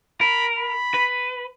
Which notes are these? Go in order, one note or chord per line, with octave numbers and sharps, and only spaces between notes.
A#4 B5
B5
B4